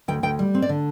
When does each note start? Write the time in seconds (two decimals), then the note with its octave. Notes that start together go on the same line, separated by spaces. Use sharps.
0.08 D2 G5
0.23 D2 G5
0.39 G3
0.55 C4
0.62 D5
0.69 D3